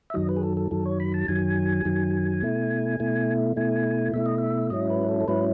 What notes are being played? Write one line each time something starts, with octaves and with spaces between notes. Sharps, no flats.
E5
F#2 D#3 F#3 D#5
B4
G#4
A4
A4
F#2 D#3 F#3 A4
C#5
B5
A5
F#2 D#3 F#3 G#5
F#2 D#3 F#3
B2 A3 E4
B2 A3 E4
B2 A3 E4 G#5
B2 A3 E4 E5
D#5
E5
G#2 F#3 C#4 E4 D#5
B4
A4
A4
G#2 F#3 C#4 E4 B4